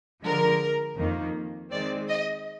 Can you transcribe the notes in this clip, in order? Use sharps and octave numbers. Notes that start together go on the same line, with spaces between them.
D3 F3 G#3 A#4
F2 D#3 A#3
D#3 G#3 C4 D5
D#5